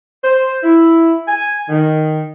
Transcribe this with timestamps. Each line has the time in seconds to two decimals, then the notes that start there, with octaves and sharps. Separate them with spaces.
0.24 C5
0.64 E4
1.28 G#5
1.69 D#3